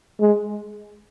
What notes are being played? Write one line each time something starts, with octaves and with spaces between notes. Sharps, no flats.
G#3